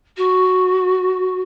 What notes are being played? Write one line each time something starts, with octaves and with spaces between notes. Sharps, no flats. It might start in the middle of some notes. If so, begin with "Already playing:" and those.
F#4